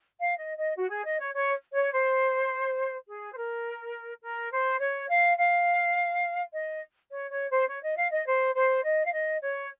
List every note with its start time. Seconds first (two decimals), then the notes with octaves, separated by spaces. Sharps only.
0.18 F5
0.37 D#5
0.57 D#5
0.77 F#4
0.90 G#4
1.05 D#5
1.20 C#5
1.33 C#5
1.72 C#5
1.92 C5
3.07 G#4
3.32 C5
3.36 A#4
4.22 A#4
4.52 C5
4.80 C#5
5.09 F5
5.38 F5
6.53 D#5
7.11 C#5
7.30 C#5
7.49 C5
7.67 C#5
7.82 D#5
7.97 F5
8.11 D#5
8.26 C5
8.54 C5
8.83 D#5
9.05 F5
9.12 D#5
9.41 C#5